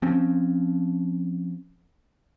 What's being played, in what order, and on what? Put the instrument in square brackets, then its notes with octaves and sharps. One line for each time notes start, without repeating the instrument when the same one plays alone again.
[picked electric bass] F3 C4 C#4